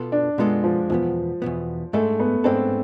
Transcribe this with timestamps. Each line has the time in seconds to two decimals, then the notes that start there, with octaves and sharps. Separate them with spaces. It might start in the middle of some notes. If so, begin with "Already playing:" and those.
Already playing: B2 B3 F4 A4
0.12 D4
0.38 B2 G#3 B3 F4 A4
0.64 F3
0.90 E2 B2 F3 B3
1.42 E2 B2 B3
1.93 G#2 G#3 A3 D4 A4
2.19 B3
2.44 G#2 G#3 C4 D4 A4